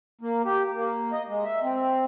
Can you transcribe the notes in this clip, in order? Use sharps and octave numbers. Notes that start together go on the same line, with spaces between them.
A#3
G4
A#3
D#5
G#3
E5
C4